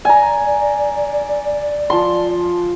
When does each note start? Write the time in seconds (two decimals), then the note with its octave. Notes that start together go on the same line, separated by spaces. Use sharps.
0.05 D5 G#5 A#5
1.90 F3 A5 C6